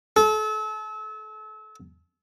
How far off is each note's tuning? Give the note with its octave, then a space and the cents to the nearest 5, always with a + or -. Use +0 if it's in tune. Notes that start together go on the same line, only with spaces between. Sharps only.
A4 -35